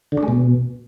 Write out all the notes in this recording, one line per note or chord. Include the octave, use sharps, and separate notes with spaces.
D3
D4
G#3
B2